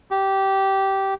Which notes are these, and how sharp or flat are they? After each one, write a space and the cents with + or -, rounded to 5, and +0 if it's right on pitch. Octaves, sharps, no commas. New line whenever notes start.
G4 -15